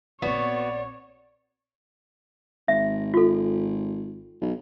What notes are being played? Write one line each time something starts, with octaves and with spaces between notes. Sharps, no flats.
A#1 B3 C4 F#4 C#5 D5
G#1 E5
F4 A4
B1